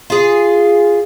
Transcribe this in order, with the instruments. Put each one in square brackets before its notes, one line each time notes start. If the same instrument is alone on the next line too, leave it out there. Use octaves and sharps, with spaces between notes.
[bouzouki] F4 G#4